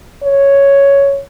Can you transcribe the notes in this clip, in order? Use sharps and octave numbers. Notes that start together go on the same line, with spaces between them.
C#5